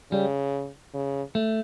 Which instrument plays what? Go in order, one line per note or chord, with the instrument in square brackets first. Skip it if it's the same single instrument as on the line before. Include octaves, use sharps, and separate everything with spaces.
[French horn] C#3 [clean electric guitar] G3
[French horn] C#3
[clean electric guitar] A3